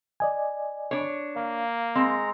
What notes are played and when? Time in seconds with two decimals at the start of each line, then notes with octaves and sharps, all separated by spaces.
0.20 D5 D#5 G#5
0.91 D4 C#5
1.36 A#3 F5
1.95 G#3 C4 A#5